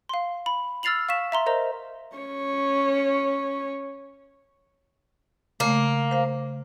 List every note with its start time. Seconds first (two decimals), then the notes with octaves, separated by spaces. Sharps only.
0.09 F5 C6
0.46 B5
0.83 E6 F6 A6 C7 F7 F#7
1.09 F5 C#6 B6 E7
1.32 E5 A#5 C6
1.46 A#4 C5 D#5 A#5
2.17 C#4 C#5
5.60 C#3 A3 A#3
6.11 C5 F5